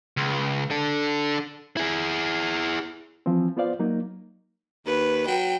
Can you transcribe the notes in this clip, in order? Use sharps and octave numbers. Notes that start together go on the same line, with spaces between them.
C#2
D4 A4
E4 G#4
E3 F3 C4
B3 F4 C5 D5 F5
F#3 A#3 D#4
D#2 B4
F#3 G5